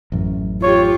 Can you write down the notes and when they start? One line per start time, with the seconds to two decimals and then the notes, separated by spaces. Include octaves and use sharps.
0.12 A1 F#2
0.62 F4 G4 C#5